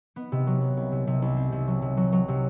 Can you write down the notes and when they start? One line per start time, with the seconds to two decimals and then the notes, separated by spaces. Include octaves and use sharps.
0.16 B3
0.32 C3
0.47 F#3
0.61 B3
0.77 C2
0.92 C3
1.07 C3
1.22 C2
1.37 C4
1.52 C3
1.67 F#3
1.82 C3
1.97 F#3
2.12 F#3
2.28 C3